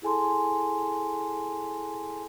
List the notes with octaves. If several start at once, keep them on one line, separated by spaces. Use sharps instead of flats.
E4 G#4 A4 G#5 A5 C6